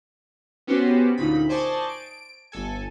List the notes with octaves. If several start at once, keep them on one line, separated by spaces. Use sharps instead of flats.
B3 C#4 F#4 G4 B4 C5
D2 A#2 D#4 B5
C5 D5 D#5 G#5 A5 C#6
D7
G1 A4 G#5